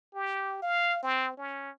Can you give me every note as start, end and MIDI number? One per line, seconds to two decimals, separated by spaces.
0.15 0.58 67
0.62 1.01 77
1.03 1.33 60
1.37 1.70 61